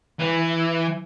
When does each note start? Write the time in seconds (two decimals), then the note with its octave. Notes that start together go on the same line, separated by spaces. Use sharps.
0.19 E3